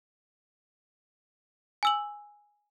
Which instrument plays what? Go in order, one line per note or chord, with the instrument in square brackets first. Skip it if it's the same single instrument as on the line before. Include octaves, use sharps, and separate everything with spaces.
[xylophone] G#5 E6 F#7